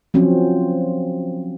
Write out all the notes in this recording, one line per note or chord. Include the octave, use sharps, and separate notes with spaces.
F3 F#3 C4 C#4